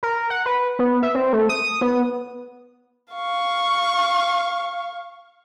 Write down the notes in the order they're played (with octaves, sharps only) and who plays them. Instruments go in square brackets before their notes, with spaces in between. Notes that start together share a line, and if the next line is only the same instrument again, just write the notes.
[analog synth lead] A#4
F#5
B4
B3
E5
C4
A3
D#6
B3
[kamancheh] F5 C#6